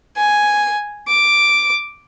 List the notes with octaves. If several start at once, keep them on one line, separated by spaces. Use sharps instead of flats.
G#5
D6